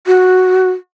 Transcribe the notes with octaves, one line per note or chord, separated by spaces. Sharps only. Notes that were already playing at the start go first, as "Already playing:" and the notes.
F#4